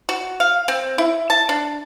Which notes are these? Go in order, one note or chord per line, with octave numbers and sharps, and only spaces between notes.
F#4
F5
C4
E4
A5
D4